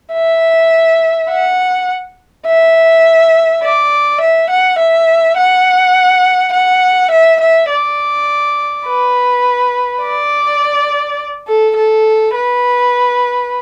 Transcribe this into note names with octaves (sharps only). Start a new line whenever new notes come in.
E5
F#5
E5
D5
E5
F#5
E5
F#5
F#5
E5
E5
D5
B4
D5
A4
A4
B4